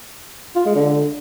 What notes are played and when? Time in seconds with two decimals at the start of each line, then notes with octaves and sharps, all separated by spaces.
0.56 F4
0.66 G#3
0.75 D3